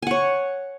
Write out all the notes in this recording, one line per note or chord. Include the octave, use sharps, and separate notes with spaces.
C#5 F#5 G#5